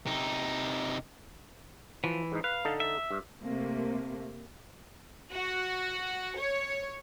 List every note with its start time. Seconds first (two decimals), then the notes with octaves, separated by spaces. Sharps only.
0.06 C3 D#4
2.04 E3 F3
2.32 G#2 D#4
2.44 B4 F5
2.65 D3 D#4 A4
2.80 E5
3.11 G2
3.43 C3 A3 A#3
5.32 F#4
6.37 C#5